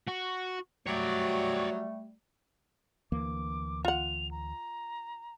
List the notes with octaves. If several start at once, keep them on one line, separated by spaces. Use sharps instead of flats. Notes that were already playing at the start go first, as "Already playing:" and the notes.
F#4
F#3 G3 A3 C#5 D5
D2 E3 A#3 D6
F4 F#5 F7
A#5